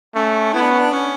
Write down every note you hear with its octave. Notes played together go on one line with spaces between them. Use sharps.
A3 C#4
B3 E4
D4
C#4
D4
C#4